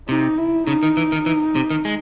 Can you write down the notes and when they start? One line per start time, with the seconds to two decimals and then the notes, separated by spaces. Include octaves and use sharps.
0.09 C3 D#4
0.38 E4
0.67 C#3 D#4
0.83 D#3
0.97 E3
1.12 D#3
1.26 E3
1.55 C3
1.70 D#3
1.85 G#3